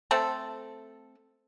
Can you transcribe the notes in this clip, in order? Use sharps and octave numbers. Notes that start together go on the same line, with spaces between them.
A3 C4 A4